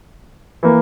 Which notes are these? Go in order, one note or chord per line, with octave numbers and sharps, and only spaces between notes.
E3 A#3